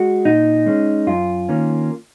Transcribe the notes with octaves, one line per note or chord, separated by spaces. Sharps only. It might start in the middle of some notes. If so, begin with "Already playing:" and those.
Already playing: G#3 F#4
A#2 D#4
G#3 C#4
F#2 F4
D#3 A#3 C#4